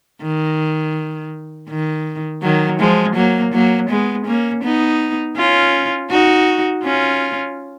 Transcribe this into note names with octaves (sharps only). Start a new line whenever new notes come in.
D#3
D#3
D#3 F#3
F3 G#3
F#3 A#3
F#3 A#3
G#3 B3
A#3 C#4
B3 D#4
C#4 F4
D#4 F#4
C#4 F4